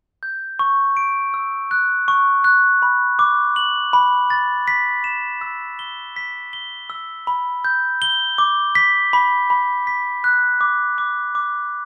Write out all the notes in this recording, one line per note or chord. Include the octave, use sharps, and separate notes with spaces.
G6
C#6
D7
E6
F#6
C#6
F#6
B5
D6
F#7
B5
A6
B6
E7
E6
G7
B6
G7
E6
B5
G6
G7
D6
B6
B5
B5
B6
F#6
D6
D6
D6